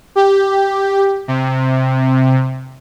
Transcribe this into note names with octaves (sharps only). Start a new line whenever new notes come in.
G4
C3